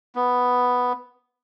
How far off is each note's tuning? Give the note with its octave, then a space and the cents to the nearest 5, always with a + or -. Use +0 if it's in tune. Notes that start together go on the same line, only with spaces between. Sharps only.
B3 +0